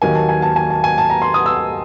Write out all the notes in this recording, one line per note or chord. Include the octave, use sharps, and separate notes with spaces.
D#2 D#3 F#3 A#3 G#5
A5
G#5
A5
G#5
A5
G#5
A5
A#5
C6
D#6
E6